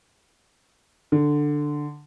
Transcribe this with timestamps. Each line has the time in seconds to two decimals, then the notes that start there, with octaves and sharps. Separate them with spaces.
1.12 D3